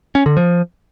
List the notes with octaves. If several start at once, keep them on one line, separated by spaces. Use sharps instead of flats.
C#4
D3
F3